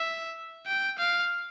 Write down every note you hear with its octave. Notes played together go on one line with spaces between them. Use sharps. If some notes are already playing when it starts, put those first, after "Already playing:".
Already playing: E5
G5
F5